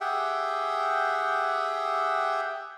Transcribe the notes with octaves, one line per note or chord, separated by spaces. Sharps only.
G4 G#4 E5 F#5 G5